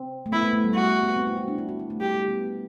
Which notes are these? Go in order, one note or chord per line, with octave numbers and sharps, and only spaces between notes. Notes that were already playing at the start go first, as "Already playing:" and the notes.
Already playing: C4
A3
B3 E4
A3
A3
G3
G3 F#4
G3
B3
C4
E4
F#4
D4
E4
F#4
E4
A3
G3 G4
G3
B3